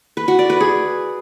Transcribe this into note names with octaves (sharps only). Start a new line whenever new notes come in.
B4
F#4
D5
B4
G#4